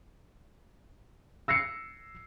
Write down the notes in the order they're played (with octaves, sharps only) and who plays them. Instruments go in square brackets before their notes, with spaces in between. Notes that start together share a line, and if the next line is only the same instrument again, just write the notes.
[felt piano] E6 A#6 C7 C#7